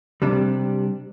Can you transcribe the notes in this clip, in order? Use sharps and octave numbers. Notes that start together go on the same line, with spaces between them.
C3 G3 D4